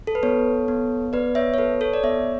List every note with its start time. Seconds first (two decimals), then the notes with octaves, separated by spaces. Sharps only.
0.07 A4
0.15 B4
0.23 B3 A4 C#5
0.68 B3
1.13 B3 B4 D5
1.35 C#5 E5
1.54 C#5
1.58 A4 B4
1.81 A4 C#5
1.94 D5
2.03 B3 C#5 E5